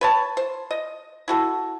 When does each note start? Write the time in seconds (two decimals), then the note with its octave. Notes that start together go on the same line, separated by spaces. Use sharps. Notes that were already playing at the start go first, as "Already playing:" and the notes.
0.01 B4 C#5 A5
0.37 C5
0.71 D#5
1.28 E4 F#4 A4